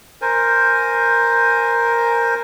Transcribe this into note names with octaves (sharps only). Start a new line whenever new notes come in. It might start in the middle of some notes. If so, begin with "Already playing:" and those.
A#4 C5 G#5